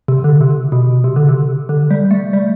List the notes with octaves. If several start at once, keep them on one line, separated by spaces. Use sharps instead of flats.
C3
D3
C3
B2
C3
D3
C3
D3
G3
A3
G3